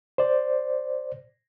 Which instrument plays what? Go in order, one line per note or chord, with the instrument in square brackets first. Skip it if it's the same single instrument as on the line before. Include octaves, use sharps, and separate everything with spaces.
[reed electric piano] C5 D5